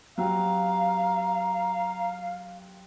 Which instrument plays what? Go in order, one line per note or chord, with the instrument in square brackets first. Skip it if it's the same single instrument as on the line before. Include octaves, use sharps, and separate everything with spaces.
[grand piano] F#3 C4 G4 [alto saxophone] F5 [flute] A#5